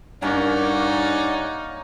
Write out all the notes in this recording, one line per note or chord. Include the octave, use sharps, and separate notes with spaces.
G2 A#3 C#4 D#4 A#4 C#5 D5 F#5